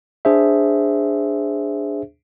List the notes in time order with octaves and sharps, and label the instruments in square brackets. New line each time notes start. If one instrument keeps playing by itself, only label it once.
[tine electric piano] D4 G#4 C5 E5